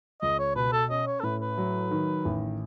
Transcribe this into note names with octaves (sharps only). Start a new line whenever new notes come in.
C#2 D#5
C#5
B2 B4
A4
C#4 D#5
C#5
A4
A2 B4
B4
F#3
D#3
A1